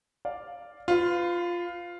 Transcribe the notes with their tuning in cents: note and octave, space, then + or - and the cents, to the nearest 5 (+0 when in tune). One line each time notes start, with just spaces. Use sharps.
D5 +0 F5 +0
F4 +0 B4 +40